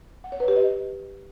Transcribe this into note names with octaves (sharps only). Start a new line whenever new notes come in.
F#5
C#5
B4
G4
D#5